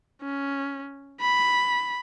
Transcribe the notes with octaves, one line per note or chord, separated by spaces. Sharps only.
C#4
B5